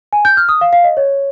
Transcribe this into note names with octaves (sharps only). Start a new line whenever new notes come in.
G#5
G6
F6
D#6
F5
F5
D#5
C#5